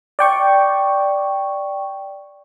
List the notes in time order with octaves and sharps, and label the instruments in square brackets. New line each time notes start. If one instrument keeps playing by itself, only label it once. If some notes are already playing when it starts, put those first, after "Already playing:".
[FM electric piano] D5 G5 C#6